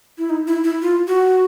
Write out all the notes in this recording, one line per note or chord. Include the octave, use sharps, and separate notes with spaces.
E4
D#4
E4
E4
F4
F#4